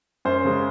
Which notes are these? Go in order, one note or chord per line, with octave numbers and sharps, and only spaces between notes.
F#2 C5
C#3 G#3